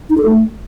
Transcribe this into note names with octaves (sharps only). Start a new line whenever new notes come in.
D#4
A4
A3